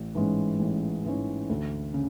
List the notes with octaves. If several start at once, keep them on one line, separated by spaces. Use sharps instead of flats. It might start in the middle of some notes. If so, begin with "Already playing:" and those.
Already playing: A1
G#2 E3 G#3 C#4
A1
G#2 E3 G#3 C#4
D2
C#3